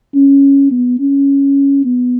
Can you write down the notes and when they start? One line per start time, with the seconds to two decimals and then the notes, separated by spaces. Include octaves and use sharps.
0.15 C#4
0.71 B3
0.99 C#4
1.85 B3